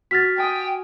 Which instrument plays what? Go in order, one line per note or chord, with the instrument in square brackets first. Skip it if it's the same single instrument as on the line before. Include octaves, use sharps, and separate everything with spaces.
[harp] F#4 F6 [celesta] A6 B6
[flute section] G5 [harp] G#5 D#6